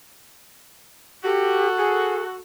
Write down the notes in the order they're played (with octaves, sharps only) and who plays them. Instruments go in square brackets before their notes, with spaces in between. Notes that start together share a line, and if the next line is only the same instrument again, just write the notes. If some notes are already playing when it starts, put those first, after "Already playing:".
[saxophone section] F#4 A4 [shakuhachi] G4
[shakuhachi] G#4